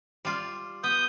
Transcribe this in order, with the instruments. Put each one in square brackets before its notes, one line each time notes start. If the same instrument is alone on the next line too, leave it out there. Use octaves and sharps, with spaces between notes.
[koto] G3 F4
[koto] B3 [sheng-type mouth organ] D#6 G6